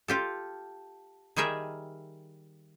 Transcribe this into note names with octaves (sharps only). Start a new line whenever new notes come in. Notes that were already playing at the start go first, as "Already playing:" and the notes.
F4 G4 A4
D#3 G3 G#4 A#4 E5